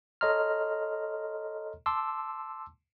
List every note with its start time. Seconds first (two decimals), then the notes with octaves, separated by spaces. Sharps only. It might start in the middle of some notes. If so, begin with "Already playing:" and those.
0.21 A4 C#5 D#5 A#5 C6 F6
1.86 A5 C6 D6 E6